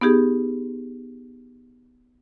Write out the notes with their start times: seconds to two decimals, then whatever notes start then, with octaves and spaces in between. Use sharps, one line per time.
0.01 B3 D#4 G4 G#4